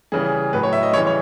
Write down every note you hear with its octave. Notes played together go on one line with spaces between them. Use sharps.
C#3 E3 G3 G#4
A2 F#3 B4
C#5
E5
D#5
C#3 E3 G3 C#5
C#5